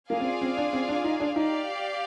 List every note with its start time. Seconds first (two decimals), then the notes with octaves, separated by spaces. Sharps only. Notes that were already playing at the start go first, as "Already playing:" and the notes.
0.10 A#3 F4 G#4 D5 F5 G#5
0.20 C4
0.41 C4
0.57 D4
0.73 C4
0.88 D4
1.04 D#4
1.20 D4
1.36 D#4 G4 D5 F5